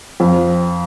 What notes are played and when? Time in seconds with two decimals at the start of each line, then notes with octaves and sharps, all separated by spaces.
0.20 F2